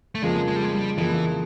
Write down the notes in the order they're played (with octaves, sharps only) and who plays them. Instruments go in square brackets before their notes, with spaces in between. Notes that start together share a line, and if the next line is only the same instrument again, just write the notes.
[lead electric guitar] A3
[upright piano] F2 C#3 F3 A#3 [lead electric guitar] G#3
[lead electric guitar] G#3
G3
G#3
G3
[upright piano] F2 C#3 F3 A#3 [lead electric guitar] E3